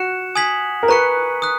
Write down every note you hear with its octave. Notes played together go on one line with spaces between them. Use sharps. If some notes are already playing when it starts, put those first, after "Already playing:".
Already playing: F#4 F#6 C#7 E7
G#5 D#6 G#6 B6 F#7
A#4
B4 A#5 C#6 F#6 C#7
D#6 F#6